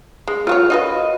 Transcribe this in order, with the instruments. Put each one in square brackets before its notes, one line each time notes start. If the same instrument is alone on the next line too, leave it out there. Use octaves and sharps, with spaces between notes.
[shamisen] G#3
[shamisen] F#3 F#4 C#5 [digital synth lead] F4
[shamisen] F4 F#4 B4 [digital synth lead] D#5